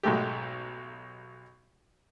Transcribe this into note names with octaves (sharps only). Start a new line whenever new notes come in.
B1 G#2 G#3 A3 G4